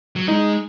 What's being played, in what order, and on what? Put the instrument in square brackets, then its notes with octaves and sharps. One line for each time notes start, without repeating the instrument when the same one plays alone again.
[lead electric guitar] F#3
[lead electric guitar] G#3 [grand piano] D#4